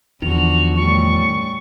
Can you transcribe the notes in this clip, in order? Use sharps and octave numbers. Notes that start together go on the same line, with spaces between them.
E2 D3 D#3 F3 F#4 F7
F#2 A2 G3 C#6